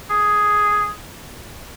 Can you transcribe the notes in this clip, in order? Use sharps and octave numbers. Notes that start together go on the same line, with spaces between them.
G#4